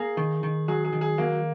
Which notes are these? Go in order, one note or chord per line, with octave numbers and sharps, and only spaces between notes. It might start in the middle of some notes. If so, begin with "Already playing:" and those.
Already playing: A#3 G#4
D#3
D#3
F#3 G#4
G#4
D#3
G#4
F#3 A#3